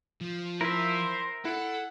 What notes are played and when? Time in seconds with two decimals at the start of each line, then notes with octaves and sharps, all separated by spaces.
0.21 F3
0.61 E4 A#4 C5 E5
1.45 E4 A4 F#5